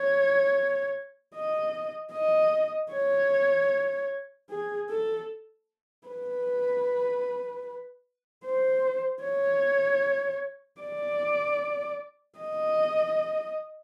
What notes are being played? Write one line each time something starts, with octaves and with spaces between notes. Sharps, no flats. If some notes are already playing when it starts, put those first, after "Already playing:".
Already playing: C#5
D#5
D#5
C#5
G#4
A4
B4
C5
C#5
D5
D#5